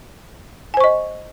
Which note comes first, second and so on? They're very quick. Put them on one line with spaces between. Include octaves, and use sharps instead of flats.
G#5 C5 C#6 D#5